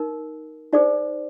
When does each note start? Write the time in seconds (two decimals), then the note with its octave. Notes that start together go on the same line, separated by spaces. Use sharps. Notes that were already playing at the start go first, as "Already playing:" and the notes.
Already playing: D#4 A#4
0.73 D#4 G#4 C5 D5